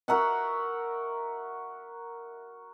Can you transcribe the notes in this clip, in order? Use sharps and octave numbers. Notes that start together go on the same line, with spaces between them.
F#4 A#4 E5 F#5